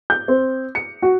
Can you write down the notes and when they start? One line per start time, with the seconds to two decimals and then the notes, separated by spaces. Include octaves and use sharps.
0.10 G6
0.28 C4
0.75 C#7
1.02 F#4